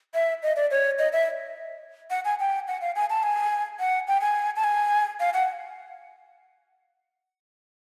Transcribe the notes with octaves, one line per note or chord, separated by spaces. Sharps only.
E5
D#5
D5
C#5
D#5
E5
F#5
G#5
G5
F#5
F5
G#5
A5
G#5
F#5
G5
G#5
A5
G#5
F5
F#5